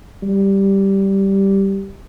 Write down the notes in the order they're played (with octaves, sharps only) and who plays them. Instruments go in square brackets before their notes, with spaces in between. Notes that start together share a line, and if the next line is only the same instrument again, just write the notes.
[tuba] G3